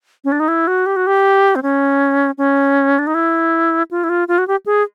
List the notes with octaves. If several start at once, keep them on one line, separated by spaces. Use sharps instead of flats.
C#4
D4
D#4
E4
F#4
G4
F#4
G4
C4
C#4
C#4
D4
D#4
E4
F4
E4
F4
F4
F#4
G4
G#4